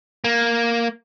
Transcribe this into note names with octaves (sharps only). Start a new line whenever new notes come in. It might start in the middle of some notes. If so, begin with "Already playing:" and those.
A#3